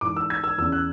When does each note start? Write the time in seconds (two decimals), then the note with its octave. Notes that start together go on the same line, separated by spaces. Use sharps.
0.01 G#2 E3 D6
0.16 E6
0.30 G#6
0.44 E6
0.58 E2 C#3 E3 E6
0.72 F#6